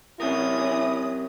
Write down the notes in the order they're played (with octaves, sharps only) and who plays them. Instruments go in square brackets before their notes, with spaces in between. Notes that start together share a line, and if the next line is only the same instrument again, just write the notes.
[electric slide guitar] C4 G4 A#4 [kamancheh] C#4 D#6 [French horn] E4